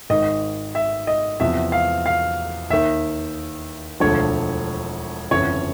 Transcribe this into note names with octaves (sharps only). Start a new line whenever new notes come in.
G#1 G#2 D#3 D#5
E5
D#5
E2 C3 F3 E5
F5
F5
D#2 D#3 E5
E1 D2 D3 F3 C#5
G1 F2 C#3 E3 C#5